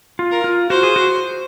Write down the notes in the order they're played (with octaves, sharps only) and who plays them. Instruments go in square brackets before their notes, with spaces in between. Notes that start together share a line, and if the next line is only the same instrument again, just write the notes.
[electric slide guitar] F4
[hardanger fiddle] A#4
[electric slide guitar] F4
[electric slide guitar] F#4 [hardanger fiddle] C5
[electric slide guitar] G#4
F#4